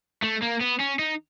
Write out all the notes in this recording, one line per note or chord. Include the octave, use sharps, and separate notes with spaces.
A3
A#3
B3
C#4
D#4